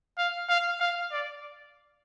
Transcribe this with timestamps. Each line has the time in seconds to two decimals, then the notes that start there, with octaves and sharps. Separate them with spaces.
0.18 F5
0.49 F5
0.80 F5
1.12 D5